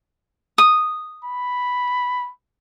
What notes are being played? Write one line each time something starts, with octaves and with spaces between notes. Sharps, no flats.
D#6
B5